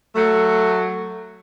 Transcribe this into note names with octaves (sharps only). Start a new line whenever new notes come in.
F#3 A3